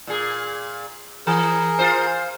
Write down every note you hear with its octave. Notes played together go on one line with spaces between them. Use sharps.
A#2 G#4
E3 G#4 A#4
F4 C5